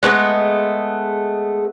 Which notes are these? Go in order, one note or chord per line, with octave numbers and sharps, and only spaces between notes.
G#3 A3 B3 D#5